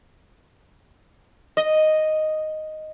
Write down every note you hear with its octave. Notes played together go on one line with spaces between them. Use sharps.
D#5